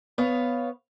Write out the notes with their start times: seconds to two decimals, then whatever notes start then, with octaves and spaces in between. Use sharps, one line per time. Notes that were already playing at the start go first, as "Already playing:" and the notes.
0.18 B3 C#5 F5